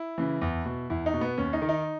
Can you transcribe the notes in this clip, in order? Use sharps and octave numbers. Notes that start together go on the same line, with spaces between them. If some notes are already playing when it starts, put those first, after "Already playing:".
Already playing: E4
C#3 E3
E2
B2
E2 E4
D#4
B2
B3
D#2 C#4
D#4
D#3
D#4